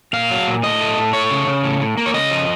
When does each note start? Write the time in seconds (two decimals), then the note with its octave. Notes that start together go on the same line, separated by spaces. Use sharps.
0.13 A#2 F5
0.30 F#3
0.47 A#2
0.63 A2 D#5
0.80 A3
0.98 A2
1.13 A3 C#5
1.31 C#3
1.47 C#3
1.64 A2
1.80 A2
1.97 A#3
2.06 C#5
2.14 C#3 D#5
2.31 F3